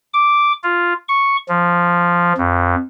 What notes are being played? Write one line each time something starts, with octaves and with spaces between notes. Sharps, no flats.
D6
F4
C#6
F3
F2